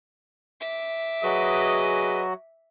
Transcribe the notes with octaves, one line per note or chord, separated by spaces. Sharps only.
E5 D6
F#3 F#4 G#4 B4 D#5